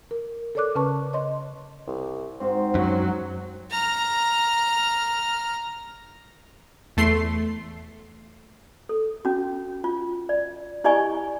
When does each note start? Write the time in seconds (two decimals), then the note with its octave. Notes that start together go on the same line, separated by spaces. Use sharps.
0.11 A#4
0.55 A4 A#4 C#5 D5 D6 F#6
0.75 C#3 C#4 B4 A5 C#6
1.13 C#5 D#5 C6
1.87 C2
2.40 G#2 C4 F#4
2.75 F#2 F#3
3.71 A#5 F6
6.97 E2 A3 C6 C7
8.89 A4
9.25 C#4 F#4
9.84 F4
10.29 D5
10.84 E4 G4 D5 D#5 G#5 C#6